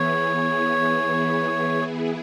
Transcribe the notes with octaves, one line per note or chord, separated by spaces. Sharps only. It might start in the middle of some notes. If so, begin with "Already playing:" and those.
Already playing: E3 B3 E4 G#4 C#5